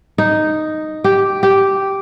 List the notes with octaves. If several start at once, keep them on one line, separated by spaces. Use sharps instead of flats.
D#4
G4
G4